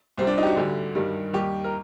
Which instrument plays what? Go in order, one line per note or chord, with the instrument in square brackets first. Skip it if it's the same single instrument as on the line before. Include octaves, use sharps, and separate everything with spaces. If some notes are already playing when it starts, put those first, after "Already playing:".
[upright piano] C2 C3 G3 C4
D4
D#4
G4
F#4
D2 D3 G3
G2 D#3 G3
D#2 D#3 G3 G4
A#4